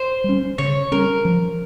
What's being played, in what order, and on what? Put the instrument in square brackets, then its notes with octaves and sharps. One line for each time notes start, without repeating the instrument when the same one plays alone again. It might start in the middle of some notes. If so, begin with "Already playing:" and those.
Already playing: [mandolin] C5
[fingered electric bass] G3 C#4
[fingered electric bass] C#3 [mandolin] C#5
[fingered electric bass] G3 C#4 [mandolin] A#4
[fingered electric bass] F3